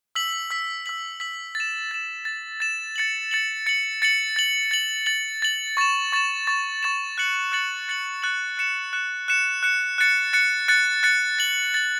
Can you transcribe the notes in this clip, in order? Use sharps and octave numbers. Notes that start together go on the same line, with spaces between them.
E6 B6 F#7
E6 B6 F#7
E6 B6 F#7
E6 B6 F#7
A6
E7
A6 E7
A6 E7
A6 E7
A6 C#7 F#7
A6 C#7 F#7
A6 C#7 F#7
A6 C#7 F#7
A6 F#7
A6 F#7
A6 F#7
A6 F#7
C#6 A6 E7
C#6 A6 E7
C#6 A6 E7
C#6 A6 E7
F#6 A6 C#7 F#7
F#6 A6 C#7 F#7
F#6 A6 C#7 F#7
F#6 A6 C#7 F#7
F#6 C#7 E7
F#6 C#7 E7
F#6 C#7 E7
F#6 C#7 E7
F#6 A6 C#7
F#6 A6 C#7
F#6 A6 C#7
F#6 A6 C#7
A6 F#7
A6 F#7